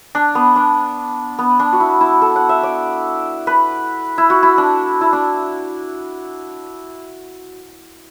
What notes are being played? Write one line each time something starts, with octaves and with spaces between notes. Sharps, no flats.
D4
B3
D4
B3
D4
F#4
E4
E4
A4
F#5
E5
D5
B4
E4
F#4
E4
D4
E4
D4